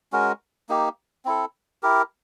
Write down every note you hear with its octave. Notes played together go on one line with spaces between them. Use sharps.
G#3 C#4 F#4 A#4
A#3 D#4 G4
C4 E4 A4
E4 G4 A#4